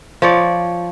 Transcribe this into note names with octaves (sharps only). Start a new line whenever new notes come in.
F3 C#5 D5